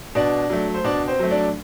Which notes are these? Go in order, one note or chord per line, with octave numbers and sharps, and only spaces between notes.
B2 D4 D5
F#3 A3
C5
B2 D4 D5
C4 C5
F#3 A3
D4 D5